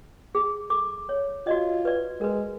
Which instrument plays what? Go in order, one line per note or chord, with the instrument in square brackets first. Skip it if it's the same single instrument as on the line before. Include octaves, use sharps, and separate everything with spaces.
[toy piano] G#4
A4 D6
C#5
[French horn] F4 [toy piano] F#4 D5 D#5
[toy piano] B4 D5
[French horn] G#3 [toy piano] A#4 B4